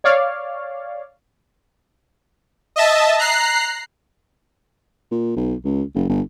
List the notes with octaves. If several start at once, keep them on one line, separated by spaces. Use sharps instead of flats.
C#5 D5 F5
D#5 E5 A5
A#5 F#6 C7
A#2
B1
C#2
F#1
G1